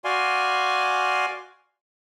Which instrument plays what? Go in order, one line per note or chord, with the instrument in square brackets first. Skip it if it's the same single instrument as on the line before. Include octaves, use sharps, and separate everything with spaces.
[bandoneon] F#4 D5 F5 G#5 C6